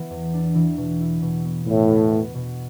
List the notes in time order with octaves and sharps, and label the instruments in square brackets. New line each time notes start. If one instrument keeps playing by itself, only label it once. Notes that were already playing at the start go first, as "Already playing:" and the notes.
Already playing: [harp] E3 B3
E2
D4
E3
B2
E4
B2
B3
[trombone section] A2 [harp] B3
[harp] B2
B3
B2